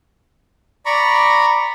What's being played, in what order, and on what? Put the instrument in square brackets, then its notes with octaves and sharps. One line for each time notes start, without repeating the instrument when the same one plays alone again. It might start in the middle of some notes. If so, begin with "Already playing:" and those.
[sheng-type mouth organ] D5 A#5 B5 C#6